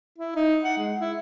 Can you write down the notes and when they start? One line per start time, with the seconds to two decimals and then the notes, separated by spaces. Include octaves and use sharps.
0.18 E4
0.36 D#4
0.64 F#5
0.77 G#3
1.00 E4